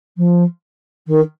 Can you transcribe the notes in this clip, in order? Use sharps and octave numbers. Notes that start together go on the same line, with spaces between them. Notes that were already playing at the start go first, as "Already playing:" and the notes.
F3
D#3